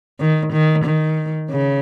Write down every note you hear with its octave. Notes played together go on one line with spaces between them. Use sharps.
D#3
D#3
D#3
C#3